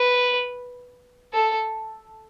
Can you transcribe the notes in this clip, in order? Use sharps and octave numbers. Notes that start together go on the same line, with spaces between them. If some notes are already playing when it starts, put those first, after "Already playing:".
Already playing: B4
A4